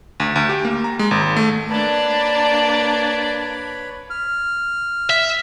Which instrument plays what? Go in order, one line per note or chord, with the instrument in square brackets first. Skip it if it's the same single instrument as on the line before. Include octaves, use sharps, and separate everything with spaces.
[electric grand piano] D2
D2
G4
A#3
A#5
G#3
G#1
A3
[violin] A#3 D4 [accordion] B4 C#5 B5 [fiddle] D5 [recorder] A5
[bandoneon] F6
[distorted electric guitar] E5